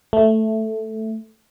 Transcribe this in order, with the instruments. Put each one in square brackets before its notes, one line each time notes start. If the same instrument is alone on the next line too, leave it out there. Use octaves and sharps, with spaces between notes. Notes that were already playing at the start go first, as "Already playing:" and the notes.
[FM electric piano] A3